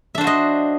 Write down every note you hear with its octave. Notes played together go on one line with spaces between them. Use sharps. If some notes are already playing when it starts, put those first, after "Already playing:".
D4 F#4 C5 D#5 E5